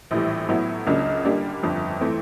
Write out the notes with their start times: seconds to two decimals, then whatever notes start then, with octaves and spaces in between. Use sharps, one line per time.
0.11 A#1 A2 E3 G3
0.48 A2 F#3 B3 E4
0.87 C#2 C#3 F#3 A#3 D4
1.25 D3 G3 A#3 D4
1.63 G1 F2 D3
2.01 E3 A3 C4